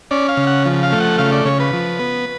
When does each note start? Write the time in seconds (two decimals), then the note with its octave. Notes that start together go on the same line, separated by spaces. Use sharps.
0.11 C#4 D5
0.29 F5
0.37 C#3
0.47 F#5
0.65 F3
0.83 F5
0.92 A3
1.00 F#5
1.18 C#3 F5
1.32 D5
1.45 C#3 C#5
1.60 B4
1.73 F3
1.99 B3